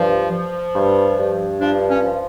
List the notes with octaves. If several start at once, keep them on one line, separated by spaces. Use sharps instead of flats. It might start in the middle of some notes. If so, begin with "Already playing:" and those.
Already playing: G2 F3
F3
G2
G2
F3 D4
C#4
F3